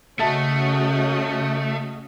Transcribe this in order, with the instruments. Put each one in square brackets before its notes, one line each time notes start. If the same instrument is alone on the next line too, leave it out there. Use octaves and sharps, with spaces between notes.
[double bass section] C#3 [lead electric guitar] A3 [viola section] C#4 F#4 D#5 [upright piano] E5 A5 A6